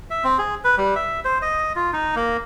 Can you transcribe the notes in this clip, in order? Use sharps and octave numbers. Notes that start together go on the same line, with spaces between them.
E5
C4
G#4
B4
G3
E5
C5
D#5
F4
D#4
A#3